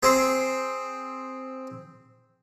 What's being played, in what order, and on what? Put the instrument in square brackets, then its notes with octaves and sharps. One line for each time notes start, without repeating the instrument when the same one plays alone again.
[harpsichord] C4 G#4 C5